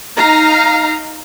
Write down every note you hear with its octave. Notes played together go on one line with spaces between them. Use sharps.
D#4 F5 A#5